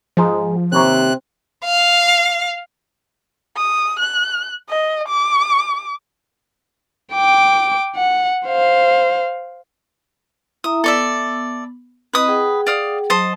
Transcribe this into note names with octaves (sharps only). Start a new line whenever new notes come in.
G#2 F3 G#3 D#4
D#2 C3 C4 C#5 A#5 F#6
F5
D#6
F#6
D#5
D6
G5 D6
F#5
C5 F5
E4 E5 A#5 D#6
B3 A4 D5 E5
C4 E4 B4 D#5 D#6
G#4 F#5 G5
D5 F5 D#6
F#3 C5 D#5 A5